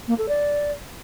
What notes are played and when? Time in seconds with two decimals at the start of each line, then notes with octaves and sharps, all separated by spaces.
0.08 A#3
0.18 A4
0.29 D5